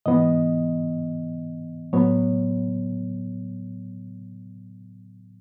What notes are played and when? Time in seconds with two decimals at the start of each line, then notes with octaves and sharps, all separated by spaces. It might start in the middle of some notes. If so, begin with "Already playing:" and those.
0.06 G#2 E3 B3 D#5
1.93 A2 F#3 B3 C#5